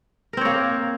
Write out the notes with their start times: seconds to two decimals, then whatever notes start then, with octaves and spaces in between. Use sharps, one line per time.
0.33 A#4
0.37 C4
0.41 C#5
0.45 A#3